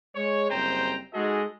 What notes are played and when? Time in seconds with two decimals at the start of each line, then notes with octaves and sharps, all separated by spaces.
0.16 G#3 C#5
0.50 F#1 G3 C4 C5 G5 A#5
1.14 G#3 D#4 F#4 G#4 A4 D#5